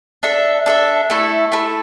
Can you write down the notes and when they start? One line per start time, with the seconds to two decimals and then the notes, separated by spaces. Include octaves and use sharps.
0.23 D4 A4 E5
0.66 D4 A4 E5
1.10 A3 E4 A4
1.52 A3 E4 A4